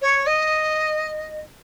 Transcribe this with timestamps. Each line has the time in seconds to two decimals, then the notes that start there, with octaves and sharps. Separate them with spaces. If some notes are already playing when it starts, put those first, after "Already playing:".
0.01 C#5
0.26 D#5